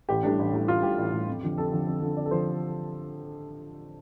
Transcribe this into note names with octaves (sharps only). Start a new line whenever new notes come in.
A1 G4
A2 G3 D4
A1
A2 G3
A1 F4
A2 G3 G4
A1
A2 G3
F2
D3 F3
F2 A4
D3 F3
F2
D3 F3
F2 D5
A4
D3 F3 C5